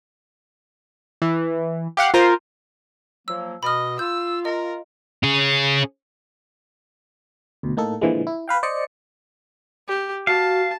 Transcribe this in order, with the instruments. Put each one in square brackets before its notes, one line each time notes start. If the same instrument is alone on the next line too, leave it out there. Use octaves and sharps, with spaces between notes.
[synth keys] E3
G4 F5 F#5
F4 A#4 C5
[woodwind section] F3 F#3 A#3 [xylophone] E6
[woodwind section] B2 [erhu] D#5 [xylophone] B5 F6
[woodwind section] F4 [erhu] E6 [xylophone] G6
[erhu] A#4 [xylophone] D#5
[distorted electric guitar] C#4 G#4
[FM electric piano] D2 B2
A2 A#3 D#4 A4
A#2 D3 E3 F3 G#3
E4
B4 F5 G5
C5 D5 D#5 C#7
[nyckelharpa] G4
[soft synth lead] F#4 [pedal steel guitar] F5 [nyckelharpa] A5